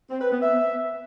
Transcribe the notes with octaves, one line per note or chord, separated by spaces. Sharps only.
C4
B4
B3
E5